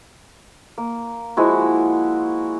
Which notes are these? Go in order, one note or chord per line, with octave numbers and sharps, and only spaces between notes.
A#3
F3 G#3 E4 F#4